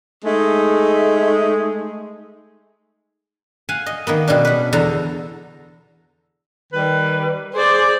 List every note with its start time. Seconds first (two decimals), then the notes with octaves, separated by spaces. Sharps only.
0.23 G#3 A3 D#4
3.69 F5 F#5 G#5
3.86 D#5
4.07 D#3 A#3 B3
4.27 B2 G3 G#3 C#4 D4
4.45 B4 F#5
4.73 E2 D3 A4 A#5
6.73 D#3 G3 B4
7.55 G#4 C5 D5